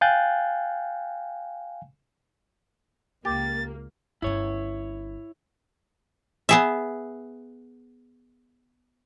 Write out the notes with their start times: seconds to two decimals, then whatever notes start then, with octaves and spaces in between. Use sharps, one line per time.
0.01 F5 G5 G#5 F#6 G6 A6
3.25 C#2 A#3 G4 A6
4.22 G1 C#4 E4 C#5
6.49 B3 G#4 E5